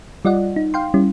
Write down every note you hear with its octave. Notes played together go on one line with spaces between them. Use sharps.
G3 F4 D5 D#5 F#5
D#4
F5 G5 C6
G3 C#4 E4